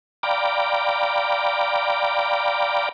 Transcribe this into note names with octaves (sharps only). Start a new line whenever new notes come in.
D5 F5 G5 A#5 B5 D6